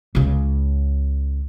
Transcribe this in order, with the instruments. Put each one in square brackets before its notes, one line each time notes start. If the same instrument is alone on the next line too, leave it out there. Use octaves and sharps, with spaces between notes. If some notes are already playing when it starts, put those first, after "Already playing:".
[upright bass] C#2 C#3